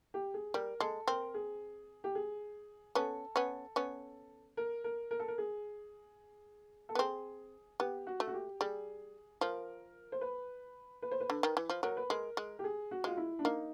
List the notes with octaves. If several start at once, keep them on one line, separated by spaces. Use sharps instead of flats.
G4
G#4
G3 A#4
G#3 A4
C4 A#4
G#4
G4
G#4
B3 C#4 A4
B3 C#4
B3 C#4
A#4
A#4
A#4
A4
A#4
G#4
A4
B3
C4 G#4
B3 G4
F#4
A3
F#4
G4
G3 G#4
F3 A#4
C5
B4
B4
C5
B4
D3
D#3
E3
F3
F#3 A#4
B4
G#3 A#4
G#3
G4
G#4
F#4
G#3 F4
E4
D4
A#3 D#4